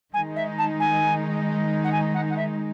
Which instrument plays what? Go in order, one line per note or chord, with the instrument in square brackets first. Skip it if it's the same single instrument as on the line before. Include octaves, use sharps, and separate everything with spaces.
[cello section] D#3 G#3 D#4 [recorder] G#5
[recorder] E5
A5
G#5
F#5
G#5
F#5
F#5
E5